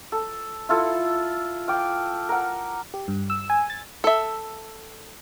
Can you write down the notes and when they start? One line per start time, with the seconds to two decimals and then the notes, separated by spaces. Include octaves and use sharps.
0.12 A4
0.69 E4 F4 A4
1.68 F5 G5 D6
2.29 A#4 F#5
2.94 G4
3.08 G2
3.30 E6
3.50 G#5
3.70 A6
4.04 A4 E5